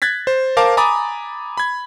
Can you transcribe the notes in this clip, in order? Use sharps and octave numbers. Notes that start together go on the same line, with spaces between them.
F#6 G#6 A6 B6
C5
A#4 C5 F5 A5 D6
G#5 A#5 B5 D6 D#6 A6
B5 G#6